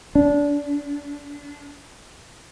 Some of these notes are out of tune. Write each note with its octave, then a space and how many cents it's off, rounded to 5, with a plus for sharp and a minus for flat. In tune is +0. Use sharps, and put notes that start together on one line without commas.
D4 -25